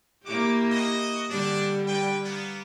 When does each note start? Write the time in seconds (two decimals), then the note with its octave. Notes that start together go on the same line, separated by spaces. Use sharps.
0.25 A#3 E4 F#4 G4 D6
0.70 F#4 D#5
1.30 D3 G3 D4
1.87 B4 D5 G5
2.24 A#3 B3